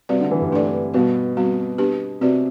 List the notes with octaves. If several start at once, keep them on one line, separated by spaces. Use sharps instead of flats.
C3 G3 C4 F#4 B4 D5
D3
E3
G2
A3 D4 A4 D5
B2 G3 B3 F#4
G3 C4 F#4
B3 D4 G4 B4
C3 C4 F#4 B4 D5